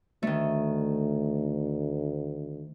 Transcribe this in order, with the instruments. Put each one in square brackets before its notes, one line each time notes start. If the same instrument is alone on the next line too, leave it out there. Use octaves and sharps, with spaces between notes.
[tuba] D2 [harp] D#3 A3